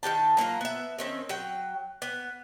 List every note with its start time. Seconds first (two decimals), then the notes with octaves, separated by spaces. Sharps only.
0.03 D#3 F4 G5 A5
0.37 F#3 A#3 F4 A#5
0.61 B3 E5
0.99 D#3 C4 C#4
1.29 F#3 G5
2.02 B3